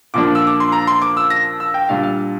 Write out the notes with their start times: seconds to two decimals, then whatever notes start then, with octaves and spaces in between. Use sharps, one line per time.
0.14 A#2 F3 A#3 D4 D6
0.35 E6
0.47 D6
0.60 C6
0.72 A#5
0.87 C6
1.02 D6
1.17 E6
1.30 A#6
1.60 E6
1.74 G5
1.89 A#2 G3 D4 F4 F5
2.03 F5